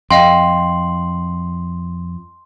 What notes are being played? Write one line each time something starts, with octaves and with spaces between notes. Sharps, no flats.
F2 D#5 F5 G5 C6